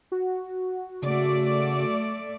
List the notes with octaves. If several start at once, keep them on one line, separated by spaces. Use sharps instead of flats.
F#4
C#3 A3 D5